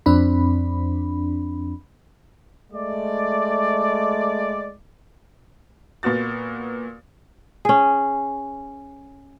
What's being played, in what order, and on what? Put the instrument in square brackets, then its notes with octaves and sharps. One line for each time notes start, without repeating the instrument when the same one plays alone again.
[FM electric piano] F2 C4 D4 B5
[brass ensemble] G#3 A3 D5
[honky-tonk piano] A#2 B3 F#4 A6
[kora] C#4 G#4